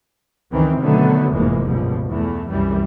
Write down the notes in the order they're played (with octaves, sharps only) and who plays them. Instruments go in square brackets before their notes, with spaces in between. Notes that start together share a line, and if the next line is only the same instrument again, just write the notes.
[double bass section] C#2 F#2 D#3 E3 C4
B2 D3 D#3 F#3 A3 B3
F1 E2 G#2 E3 G#3 A#3
C#2 G2 B2 F3
E2 E3 A3
C2 F#2 E3 G3